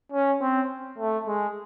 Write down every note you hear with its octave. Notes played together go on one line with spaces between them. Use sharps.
C#4
C4
A3
G#3